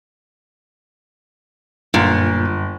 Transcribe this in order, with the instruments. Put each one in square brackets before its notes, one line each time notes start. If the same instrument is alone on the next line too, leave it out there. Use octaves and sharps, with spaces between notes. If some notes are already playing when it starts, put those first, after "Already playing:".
[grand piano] G1 [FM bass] F#2 [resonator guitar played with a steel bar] A#2